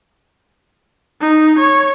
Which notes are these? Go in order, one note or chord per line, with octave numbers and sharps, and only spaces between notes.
D#4
C#5